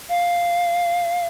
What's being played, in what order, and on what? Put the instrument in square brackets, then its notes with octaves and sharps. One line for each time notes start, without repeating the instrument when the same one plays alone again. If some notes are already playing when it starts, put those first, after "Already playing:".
[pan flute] F5